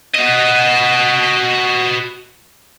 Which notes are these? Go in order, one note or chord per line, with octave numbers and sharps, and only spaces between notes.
F#4 D#5